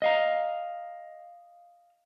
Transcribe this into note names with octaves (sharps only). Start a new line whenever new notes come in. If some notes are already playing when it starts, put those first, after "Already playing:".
D#5 F5 A#5